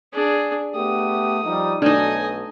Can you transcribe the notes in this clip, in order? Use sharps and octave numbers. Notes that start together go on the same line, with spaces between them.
D4 G#4
A3 B3 G4 D#6
F3 G3 D#4
B1 A3 D4 D#4 D#5 G#5